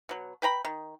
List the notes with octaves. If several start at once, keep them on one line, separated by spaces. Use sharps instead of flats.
B2 F#3
B4 G5 A#5 B5
D#3